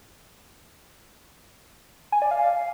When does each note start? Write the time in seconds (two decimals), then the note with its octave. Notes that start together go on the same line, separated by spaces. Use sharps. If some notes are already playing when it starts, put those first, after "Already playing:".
2.12 G#5
2.22 D5
2.31 F5